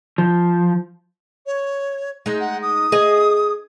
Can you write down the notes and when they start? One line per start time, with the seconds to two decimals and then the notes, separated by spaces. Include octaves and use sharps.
0.18 F3
1.46 C#5
2.26 G#3 D#4
2.40 F#5
2.62 D#6
2.92 G#4 D#5